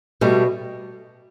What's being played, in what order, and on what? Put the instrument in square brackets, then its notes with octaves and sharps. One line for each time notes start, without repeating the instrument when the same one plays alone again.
[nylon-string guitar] B2 G3 A3